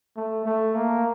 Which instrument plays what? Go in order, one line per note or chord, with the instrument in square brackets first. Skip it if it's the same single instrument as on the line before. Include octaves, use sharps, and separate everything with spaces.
[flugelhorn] A3
A3
A#3